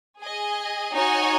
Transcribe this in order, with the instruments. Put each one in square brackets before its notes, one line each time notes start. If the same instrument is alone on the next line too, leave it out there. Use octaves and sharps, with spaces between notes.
[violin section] G#4 D#5 G#5
D#4 F#4 C#5 G#5